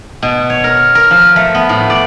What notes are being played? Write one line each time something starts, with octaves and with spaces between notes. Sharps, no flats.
B2
C#5
A#4
A#4
F3
A3
B3
A2
D5